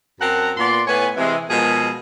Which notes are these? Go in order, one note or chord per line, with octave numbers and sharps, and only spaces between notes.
F#2 C4 A#4 F#5 A5 A#5
A#2 B3 D5 C6
A2 B3 B4 C#5 G#5
C3 E3 G#3
B2 F3 G#3 G#4 A#4